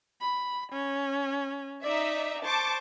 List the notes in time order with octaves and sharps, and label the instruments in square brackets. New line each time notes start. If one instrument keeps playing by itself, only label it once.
[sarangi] B5
C#4
[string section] D#4 E5 [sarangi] D5
[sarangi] C5 [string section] A5 C#6 D6